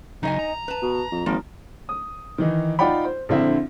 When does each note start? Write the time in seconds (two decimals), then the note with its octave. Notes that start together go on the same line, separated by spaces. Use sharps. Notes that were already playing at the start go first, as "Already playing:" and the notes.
0.23 C#3 F#3 D#4 D#5 G#5
0.39 A#5
0.68 B4 A5
0.82 B2
1.11 F2
1.26 G#1 F3 A#3
1.89 D#6
2.38 D#3 E3 D#4
2.79 D#4 F4 D5 F#5 G5 B5
3.05 C5
3.29 A#1 D3 C4 E4 E5